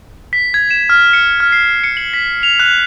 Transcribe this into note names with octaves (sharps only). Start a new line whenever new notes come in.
B6
G#6
E7
F6
C#7
F6
C7
C#7
F#7
B6
F7
F#6